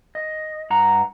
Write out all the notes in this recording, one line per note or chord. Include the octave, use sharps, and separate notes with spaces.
D#5
G2 F#5 A#5